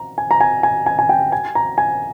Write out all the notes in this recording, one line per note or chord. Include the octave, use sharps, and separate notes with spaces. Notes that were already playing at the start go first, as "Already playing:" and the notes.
Already playing: A#5
G#5
A#5
G#5
G#5
G#5
G#5
G5
G#5
A#5
G#5